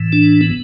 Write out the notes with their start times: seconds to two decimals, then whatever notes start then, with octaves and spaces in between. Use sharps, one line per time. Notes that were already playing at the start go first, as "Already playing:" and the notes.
Already playing: A2 E3
0.13 D4
0.41 B3